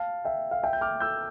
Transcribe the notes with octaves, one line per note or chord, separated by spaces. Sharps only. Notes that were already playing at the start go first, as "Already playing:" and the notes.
Already playing: F5 A5
E5 G5
F5
E5 G5
G6
D6 F6
E6 G6